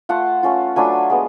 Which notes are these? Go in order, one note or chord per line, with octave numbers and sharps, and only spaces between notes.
A3 F4 F#5 A5
A3 C#4 F4
F#3 A3 D4 F4 G#5 B5
G#3 B3